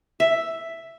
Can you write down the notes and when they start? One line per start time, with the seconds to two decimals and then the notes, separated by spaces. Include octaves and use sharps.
0.20 E5